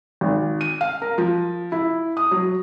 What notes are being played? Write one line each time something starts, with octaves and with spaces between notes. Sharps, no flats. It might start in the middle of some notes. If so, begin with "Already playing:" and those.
G#1
D#7
F5
A#4
F3
E4
D#6
F#3